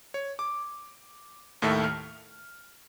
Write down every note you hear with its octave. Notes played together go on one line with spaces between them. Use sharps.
C#5
D6
D#2 A2 D#3 A3 E5
F6